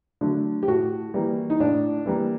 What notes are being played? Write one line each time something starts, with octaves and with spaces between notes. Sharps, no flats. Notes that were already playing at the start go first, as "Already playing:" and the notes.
D3 F#3 A3
G4
A2 F#4
E3 G3 A#3
D#4
A2 D4
E3 G3 A#3